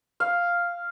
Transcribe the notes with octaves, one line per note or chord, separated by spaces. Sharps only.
F5